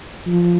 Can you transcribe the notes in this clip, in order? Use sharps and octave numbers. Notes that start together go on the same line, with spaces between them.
F3